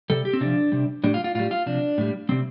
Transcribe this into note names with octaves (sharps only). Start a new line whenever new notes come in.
C3 G3 A4
G4
C4
C3 F3 D4
C3 G3
A2 G3 D4
F4
F4
A2 G3 F4
F4
C3 F3 D4
A2 G3
C3 G3 C4